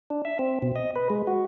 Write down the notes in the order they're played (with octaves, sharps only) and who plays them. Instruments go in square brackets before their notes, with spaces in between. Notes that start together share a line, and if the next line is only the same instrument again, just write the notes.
[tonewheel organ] D4
E5
C4
B2
D#5
B4
G#3
F#4